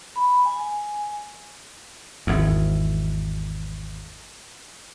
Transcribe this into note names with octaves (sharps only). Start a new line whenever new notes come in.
B5
G#5
G#1 E2